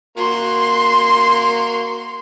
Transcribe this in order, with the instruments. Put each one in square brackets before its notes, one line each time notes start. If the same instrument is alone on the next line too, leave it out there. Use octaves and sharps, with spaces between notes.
[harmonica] A#3 F#4 [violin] C6